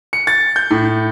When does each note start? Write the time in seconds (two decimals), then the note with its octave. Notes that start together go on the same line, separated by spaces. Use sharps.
0.13 C#7
0.27 A6
0.56 G6
0.70 A2